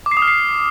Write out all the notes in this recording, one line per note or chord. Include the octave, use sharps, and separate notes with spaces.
D6
C7
D#6
F6
C7